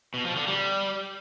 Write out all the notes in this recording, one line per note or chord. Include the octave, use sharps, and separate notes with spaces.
B2
F3
D3
G3